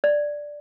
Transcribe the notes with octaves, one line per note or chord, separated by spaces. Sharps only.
D5